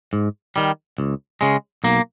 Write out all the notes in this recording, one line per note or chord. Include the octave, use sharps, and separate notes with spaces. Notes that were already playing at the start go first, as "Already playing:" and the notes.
G#2
D#3 G3
C#2
C#3 G#3
B1 A#3